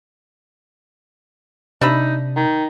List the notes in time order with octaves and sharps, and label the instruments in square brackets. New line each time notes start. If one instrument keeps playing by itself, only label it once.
[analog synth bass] C3 [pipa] D4 E5 B5 [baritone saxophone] D#4
[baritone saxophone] D#3